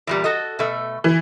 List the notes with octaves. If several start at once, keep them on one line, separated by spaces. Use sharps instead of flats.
E2 A#2 G3
F#4 A4 D#5
B2 A3
E3